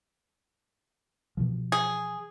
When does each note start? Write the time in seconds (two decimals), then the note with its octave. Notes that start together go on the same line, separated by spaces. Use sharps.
1.37 B2 E3 F3
1.72 G#4